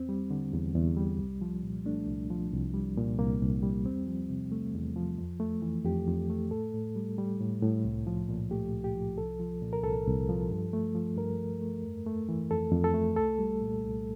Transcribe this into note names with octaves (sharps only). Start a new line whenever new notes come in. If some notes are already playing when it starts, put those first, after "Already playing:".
Already playing: E2 C4
G3
D3
E2
E2
G3
C2
F3
A#2
A3 D4
C2
F3
C2
G3
A#2
C2 A#3
C2
G3
E2 C4
F3
C3
A3
E2
F3
F2
A3
E3
F2 G4
F2
A3
A2 A4
A2
G3
G3
A2
A2
C2
F3
A#2
A3 G4
C2
G4
F3
C2 A4
F3
A#2
A#4
C2 A4
C2
F3
G2
A3
F3
G2 A#4
G2
A3
F2
A3
E3
F2 A4
F2
A4
A3
C2 A4
G3
A#2
C2